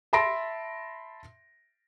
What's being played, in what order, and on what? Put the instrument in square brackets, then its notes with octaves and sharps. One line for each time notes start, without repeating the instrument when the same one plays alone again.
[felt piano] E5 A5 B5 C6 A#6 D7